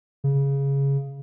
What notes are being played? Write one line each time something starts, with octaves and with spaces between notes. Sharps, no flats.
C#3